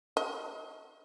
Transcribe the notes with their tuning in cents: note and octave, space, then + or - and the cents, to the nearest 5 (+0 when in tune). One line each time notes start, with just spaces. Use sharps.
D#5 +35